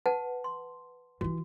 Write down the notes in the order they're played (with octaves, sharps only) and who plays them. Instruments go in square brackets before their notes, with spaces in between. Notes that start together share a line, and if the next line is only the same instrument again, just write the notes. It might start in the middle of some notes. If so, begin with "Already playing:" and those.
[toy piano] B4 F#5 A5
C6
[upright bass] E3 F4 [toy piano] F#4